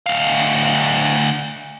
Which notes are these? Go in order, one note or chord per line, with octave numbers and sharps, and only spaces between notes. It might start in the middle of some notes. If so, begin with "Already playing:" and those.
D2 F5